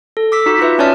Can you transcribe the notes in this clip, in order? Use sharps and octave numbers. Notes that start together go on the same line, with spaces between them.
A4
D6 E6 B6
D#4 F#4
F4 F#4 B4 E5
C#4 C#5 D5 E5 A5 F6